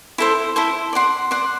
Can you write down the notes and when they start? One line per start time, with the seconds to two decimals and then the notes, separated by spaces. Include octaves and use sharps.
0.18 E4 A4 C5
0.56 E4 A4 C5
0.93 D5 F#5 C6
1.31 D5 F#5 C6